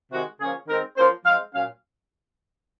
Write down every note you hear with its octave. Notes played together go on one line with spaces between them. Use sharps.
C3 D#3 G#3 F#4
C#3 F3 A#3 C#4 G#4
D#3 G#3 C4 A#4
F3 A#3 C#4 C5
F3 G#3 C4 F5
A#2 F#3 C#4 F5